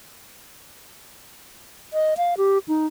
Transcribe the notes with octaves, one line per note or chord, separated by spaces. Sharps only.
D#5
F5
G4
D#4